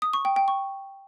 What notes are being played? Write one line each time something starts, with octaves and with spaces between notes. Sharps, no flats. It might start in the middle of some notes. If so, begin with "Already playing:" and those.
D#6
C#6
G5
G5
C#6